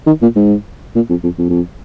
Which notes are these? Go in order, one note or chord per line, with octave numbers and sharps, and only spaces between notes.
D#3
A#2
G#2
A#2
F2
F2
F2
F2